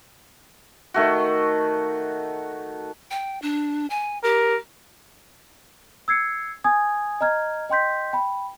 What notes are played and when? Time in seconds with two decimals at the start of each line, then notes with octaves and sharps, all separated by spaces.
0.94 D#3 A3 F#4
3.11 G5
3.42 D4
3.90 G#5
4.24 G4 A#4
6.08 E6 G#6 C7 C#7
6.64 G#5 D#6 G#6
7.21 D#5 A#5 F6 G#6
7.69 D#5 G5 C6 G6 B6
8.13 G5 B5